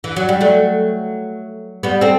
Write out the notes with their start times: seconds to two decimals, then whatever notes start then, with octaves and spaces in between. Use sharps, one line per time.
0.04 E3
0.16 F#3
0.29 G3
0.41 F#3 A3
1.83 G3 B3
2.01 A3 C4